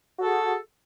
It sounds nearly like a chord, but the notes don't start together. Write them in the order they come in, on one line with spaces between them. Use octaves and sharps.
F#4 A4 G#4